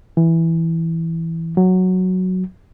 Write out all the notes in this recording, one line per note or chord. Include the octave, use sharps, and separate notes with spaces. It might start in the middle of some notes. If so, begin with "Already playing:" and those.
E3
F#3